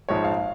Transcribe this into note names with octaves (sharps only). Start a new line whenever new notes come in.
A#1 G#2 F3 C#5
F5